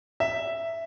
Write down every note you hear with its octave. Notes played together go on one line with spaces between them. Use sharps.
E5